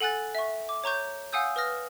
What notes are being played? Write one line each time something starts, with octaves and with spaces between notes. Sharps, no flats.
A4 F#5 G#5 F#6 A6
E5 C#6
D6
C#5 A#5 C#6 G6
F5 F#5 G#5 D#6 E6 G6
B4 D#6 F6 A#6